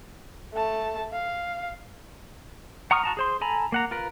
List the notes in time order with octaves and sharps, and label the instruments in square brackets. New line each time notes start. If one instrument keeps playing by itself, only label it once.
[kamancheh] A3 A5
F5
[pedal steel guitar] F#5 A#5 C#6 D#6 F6
F#4 A5 A#5
G#4 C5 C6
A4 G#5 A#5 B5
A#3 F#5 A#5
F4 A#4 B4